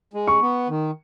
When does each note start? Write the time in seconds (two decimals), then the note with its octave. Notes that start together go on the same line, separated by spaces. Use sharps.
0.14 G#3
0.27 C#6
0.41 B3
0.69 D#3